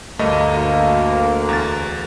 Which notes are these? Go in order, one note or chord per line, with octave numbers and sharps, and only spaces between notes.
D2 G2 A3 A#3 D#5
E2 A6